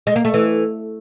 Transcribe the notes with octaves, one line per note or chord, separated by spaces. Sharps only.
G#3
A#3
A3
E3